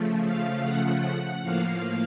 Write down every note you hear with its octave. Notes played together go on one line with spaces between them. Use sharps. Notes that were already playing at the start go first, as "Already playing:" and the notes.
Already playing: C#3 F3 A3
F5
F#5
A2 F3 A#3 F5